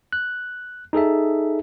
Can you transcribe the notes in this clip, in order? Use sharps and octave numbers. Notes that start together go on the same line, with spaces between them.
F#6
D#4 G#4 A4 E5